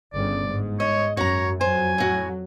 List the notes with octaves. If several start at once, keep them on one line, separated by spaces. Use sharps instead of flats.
G1 C#3 D5
G#2
C#5 D#5
F#2 F#4 C#5 A#5
F2 F#3 C5 G#5
A2 F#4